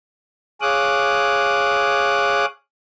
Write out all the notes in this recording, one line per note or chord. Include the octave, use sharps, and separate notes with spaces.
G#4 C#5 F5 D6 D#6 F#6